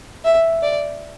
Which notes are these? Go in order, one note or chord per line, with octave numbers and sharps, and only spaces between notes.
E5
D5